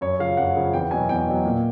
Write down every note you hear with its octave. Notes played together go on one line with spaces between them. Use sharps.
F#2 C#5
C#3 F3 F5
F#2 F#5
C#3 F3
E2 G5
B2 F#3 G#5
E2 G5
B2 F#3
A#2